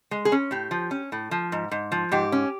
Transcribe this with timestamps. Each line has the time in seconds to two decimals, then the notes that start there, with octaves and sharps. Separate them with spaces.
0.11 G#3
0.25 G#4
0.32 C#4
0.51 A2 G4
0.71 F3
0.91 C#4
1.12 A2
1.31 F3
1.52 G#2
1.71 G#2
1.92 F3
2.12 G#2 G4
2.32 C#4